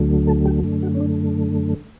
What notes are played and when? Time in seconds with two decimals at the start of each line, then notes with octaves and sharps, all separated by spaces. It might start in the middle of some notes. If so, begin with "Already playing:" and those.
Already playing: D2 D3 F#3 A3
0.27 A4
0.46 G4
0.64 F#2 D3 A3
0.83 F#4
0.94 C#4
1.01 D4